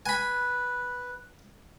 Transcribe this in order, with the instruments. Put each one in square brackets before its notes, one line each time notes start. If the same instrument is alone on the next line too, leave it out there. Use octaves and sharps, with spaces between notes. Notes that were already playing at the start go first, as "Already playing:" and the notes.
[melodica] B4 [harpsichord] G#5 B5